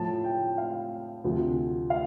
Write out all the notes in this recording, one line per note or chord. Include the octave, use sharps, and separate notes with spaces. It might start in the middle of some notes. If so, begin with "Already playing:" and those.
Already playing: A2 F3 A5
G5
F5
D2 C3 F3
F5